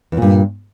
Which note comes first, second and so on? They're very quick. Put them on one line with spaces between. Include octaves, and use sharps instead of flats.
E2 A#2 G2